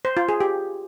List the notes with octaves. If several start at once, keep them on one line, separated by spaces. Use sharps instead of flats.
C5
F4
G#4
G4